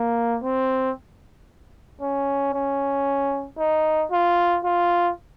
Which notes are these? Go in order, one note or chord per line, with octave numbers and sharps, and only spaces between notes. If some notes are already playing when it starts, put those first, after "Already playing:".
Already playing: A#3
C4
C#4
C#4
D#4
F4
F4